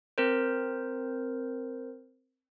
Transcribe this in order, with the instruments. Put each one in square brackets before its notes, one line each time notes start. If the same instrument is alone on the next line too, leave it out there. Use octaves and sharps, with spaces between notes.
[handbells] C4 A#4 C5